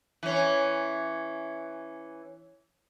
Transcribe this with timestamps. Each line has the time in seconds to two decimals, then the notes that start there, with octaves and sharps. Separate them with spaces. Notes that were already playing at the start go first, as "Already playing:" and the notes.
0.23 E3 C#4